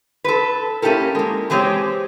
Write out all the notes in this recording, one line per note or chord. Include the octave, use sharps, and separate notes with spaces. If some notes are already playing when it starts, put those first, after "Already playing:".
A4 B4
A#3 C#4 E4 G4 A4 A#4
G#3 A#3
E3 G#3 C4 G4 C#5